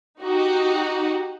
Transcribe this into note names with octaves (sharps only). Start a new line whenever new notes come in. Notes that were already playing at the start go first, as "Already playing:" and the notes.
D#4 F#4 G4